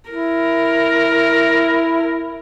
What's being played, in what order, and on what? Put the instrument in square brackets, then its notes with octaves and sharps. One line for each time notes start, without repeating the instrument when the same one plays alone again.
[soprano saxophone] E4 [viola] A#4